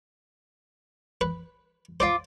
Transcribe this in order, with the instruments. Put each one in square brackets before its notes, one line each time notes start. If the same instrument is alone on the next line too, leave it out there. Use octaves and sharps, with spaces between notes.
[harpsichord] B4
[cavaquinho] F4 D6 [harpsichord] C5 D5